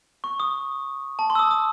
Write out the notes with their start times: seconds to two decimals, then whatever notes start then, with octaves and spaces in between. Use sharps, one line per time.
0.24 C#6
0.40 D#6
1.19 A5
1.30 C6
1.35 E6
1.39 D#6
1.51 D#6